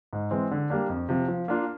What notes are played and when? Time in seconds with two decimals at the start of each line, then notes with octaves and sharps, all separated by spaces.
0.13 G#2
0.31 E3 G#3 C4
0.51 D3
0.70 G3 A#3 D4
0.89 F2
1.09 C3 F3
1.28 F3
1.48 A#3 D4 F4